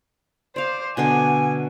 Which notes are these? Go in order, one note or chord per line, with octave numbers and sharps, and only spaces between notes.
C5 D5 F5
B2 D3 D4 G#5